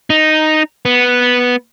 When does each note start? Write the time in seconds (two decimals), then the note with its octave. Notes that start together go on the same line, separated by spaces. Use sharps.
0.10 D#4
0.85 B3